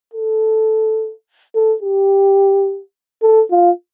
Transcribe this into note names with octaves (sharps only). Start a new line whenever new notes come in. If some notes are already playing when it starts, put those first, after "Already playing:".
A4
A4
G4
A4
F4